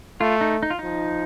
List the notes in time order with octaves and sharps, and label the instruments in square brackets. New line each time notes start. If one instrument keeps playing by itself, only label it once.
[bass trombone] A3 [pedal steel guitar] F4
[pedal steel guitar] D#4
D#4
F4
[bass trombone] F3 [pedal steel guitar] D#4